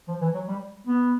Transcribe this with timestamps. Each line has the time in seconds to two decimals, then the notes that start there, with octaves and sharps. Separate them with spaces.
0.08 F3
0.21 E3
0.34 F#3
0.48 G3
0.87 B3